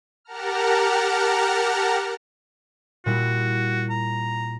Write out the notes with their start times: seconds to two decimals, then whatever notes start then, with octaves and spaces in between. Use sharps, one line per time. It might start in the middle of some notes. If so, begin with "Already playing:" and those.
0.25 G4 A#4 F#5 A5 A#5 F6
3.06 A#2 G3 E4 F#4
3.90 A#5